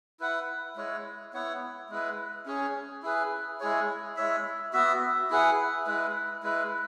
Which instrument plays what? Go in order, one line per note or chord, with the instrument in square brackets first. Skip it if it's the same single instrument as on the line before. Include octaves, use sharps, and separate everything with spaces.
[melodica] E4 B4 F#5
G#3 E4 C#5
B3 E4 C#5 F#5
G#3 E4 B4
C#4 G#4 C#5
E4 G#4 B4
G#3 E4 G#4 C#5
G#3 E4 C#5 E5
B3 F#4 E5
E4 G#4 B4 F#5
G#3 E4 B4
G#3 E4 B4